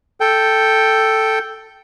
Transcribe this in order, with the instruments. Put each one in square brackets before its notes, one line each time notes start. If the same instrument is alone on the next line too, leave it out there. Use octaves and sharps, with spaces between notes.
[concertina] A4 G5